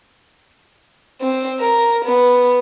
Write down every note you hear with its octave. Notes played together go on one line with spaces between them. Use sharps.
C4
A#4
B3